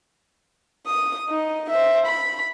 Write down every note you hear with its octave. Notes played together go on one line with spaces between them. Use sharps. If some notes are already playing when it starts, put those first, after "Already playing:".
D#6
D#4
C5 E5
B5